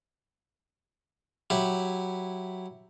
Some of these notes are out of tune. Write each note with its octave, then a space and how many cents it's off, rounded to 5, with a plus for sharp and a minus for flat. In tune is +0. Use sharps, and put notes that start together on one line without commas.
F#3 +0 E4 +0 G4 +0